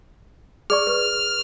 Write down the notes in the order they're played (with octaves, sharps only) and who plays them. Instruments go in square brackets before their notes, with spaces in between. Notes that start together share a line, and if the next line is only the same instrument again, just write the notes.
[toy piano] G#4 D5 C#6 [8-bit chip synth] F6
[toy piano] B4